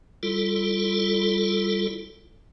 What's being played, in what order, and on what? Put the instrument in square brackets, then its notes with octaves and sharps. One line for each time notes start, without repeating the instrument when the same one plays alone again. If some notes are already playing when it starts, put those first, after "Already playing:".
[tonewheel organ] G3 E4 F4 A4